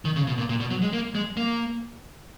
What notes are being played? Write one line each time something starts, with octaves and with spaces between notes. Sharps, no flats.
D#3
C#3
B2
A#2
A#2
B2
F#3
G#3
A#3
G#3
A#3